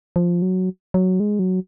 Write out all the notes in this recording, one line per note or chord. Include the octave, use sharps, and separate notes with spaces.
F3
F#3
F#3
G#3
F#3